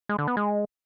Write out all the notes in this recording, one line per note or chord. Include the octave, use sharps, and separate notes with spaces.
G#3
D3
B3
G#3